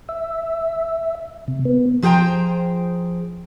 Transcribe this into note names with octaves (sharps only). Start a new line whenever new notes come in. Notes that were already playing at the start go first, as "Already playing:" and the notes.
E5
C3
B3
F3 G#4 C5 C#5 G5 A#5